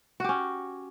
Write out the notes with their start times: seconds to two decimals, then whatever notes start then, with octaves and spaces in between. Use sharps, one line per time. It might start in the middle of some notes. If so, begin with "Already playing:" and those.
0.20 F#4
0.24 G4
0.29 C#4